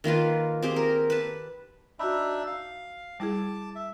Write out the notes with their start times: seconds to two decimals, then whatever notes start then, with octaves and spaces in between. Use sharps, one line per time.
0.04 D#3 A#3 F4 B4
0.63 C4 G4 G#4
0.76 A#4
1.10 B4 A5
1.99 D4 D#4 F#4 E5 B5
2.47 F5
3.20 G3 E4 G#4 A5 D6
3.76 E5